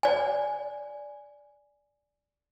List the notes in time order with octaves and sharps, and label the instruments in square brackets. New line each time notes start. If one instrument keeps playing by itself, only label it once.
[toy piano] D5 G#5